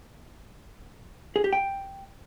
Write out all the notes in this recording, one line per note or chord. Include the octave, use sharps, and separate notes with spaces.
G#4
G4
G5